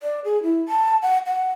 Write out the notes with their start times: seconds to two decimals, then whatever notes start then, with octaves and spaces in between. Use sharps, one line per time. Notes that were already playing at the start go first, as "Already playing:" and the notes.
0.03 D5
0.25 G#4
0.43 E4
0.68 A5
1.03 F#5
1.27 F#5